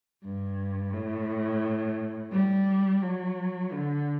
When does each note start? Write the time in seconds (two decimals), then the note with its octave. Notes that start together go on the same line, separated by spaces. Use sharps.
0.24 G2
0.93 A2
2.33 G3
3.02 F#3
3.72 D3